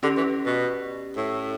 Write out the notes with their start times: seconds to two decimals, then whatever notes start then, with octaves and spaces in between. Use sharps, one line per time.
0.03 D3 C#4 G4 D5
0.17 E3
0.46 B2
1.17 A2